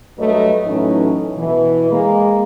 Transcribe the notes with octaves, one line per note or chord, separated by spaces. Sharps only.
G2 F#3 A3 B4 D#5
A2 E3 F#3 A3 C#4 D#4
B2 E3
G#3 A#3